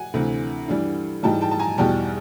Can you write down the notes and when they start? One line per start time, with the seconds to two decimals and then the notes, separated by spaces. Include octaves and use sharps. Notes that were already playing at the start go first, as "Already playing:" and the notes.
Already playing: F#5 G#5
0.14 D2 C3 E3
0.68 G2 E3 G3
1.23 G#2 E3 G3 G5 A5
1.41 G5 A5
1.51 A5
1.59 G#5 A#5
1.78 E2 B2 G3 G5 A5